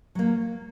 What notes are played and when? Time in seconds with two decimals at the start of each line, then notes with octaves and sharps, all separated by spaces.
0.15 F#3 A#3